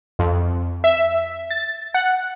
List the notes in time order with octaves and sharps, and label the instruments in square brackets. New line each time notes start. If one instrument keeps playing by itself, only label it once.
[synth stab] F2
E5
A6
F#5